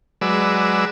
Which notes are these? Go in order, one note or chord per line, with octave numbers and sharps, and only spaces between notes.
F#3 G#3 B4 D5 E6